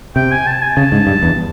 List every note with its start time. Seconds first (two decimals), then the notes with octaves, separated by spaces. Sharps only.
0.16 C3 G5
0.32 G#5
0.47 A5
0.61 G#5
0.77 C#3 A5
0.92 G#2
1.07 G2
1.23 E2